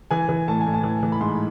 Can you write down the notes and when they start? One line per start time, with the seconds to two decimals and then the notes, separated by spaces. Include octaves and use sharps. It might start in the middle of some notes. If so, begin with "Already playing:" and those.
0.11 E3 G#5
0.29 E3
0.48 A2 A5
0.61 G#5
0.66 A2
0.74 A5
0.84 E3
1.03 E3
1.12 B5
1.20 G#2 C6